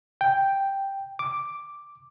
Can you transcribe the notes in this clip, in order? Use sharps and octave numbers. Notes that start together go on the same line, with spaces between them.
G5
D6